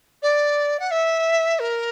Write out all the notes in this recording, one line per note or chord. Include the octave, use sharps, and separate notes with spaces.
D5
F#5
E5
A#4